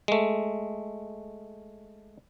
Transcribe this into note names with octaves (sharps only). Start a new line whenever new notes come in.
G#3 A3